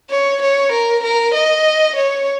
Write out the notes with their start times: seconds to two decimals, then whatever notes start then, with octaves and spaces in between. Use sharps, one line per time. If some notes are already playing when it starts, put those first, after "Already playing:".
0.10 C#5
0.42 C#5
0.72 A#4
1.03 A#4
1.34 D#5
1.96 C#5